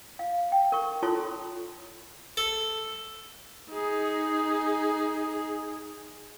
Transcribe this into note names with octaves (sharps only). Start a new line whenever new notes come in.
F5
G5
A#4 C#6
E4 F4 A4 C#5 A5 C6
A4
D#4 G#4